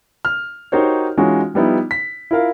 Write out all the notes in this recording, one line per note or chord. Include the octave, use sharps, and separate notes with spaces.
F6
D#4 F#4 G4 A#4 C5 C#5
E3 G#3 C#4 D#4 F4 F#4
F3 G3 B3 D#4 E4
B6
E4 F4 A#4 F5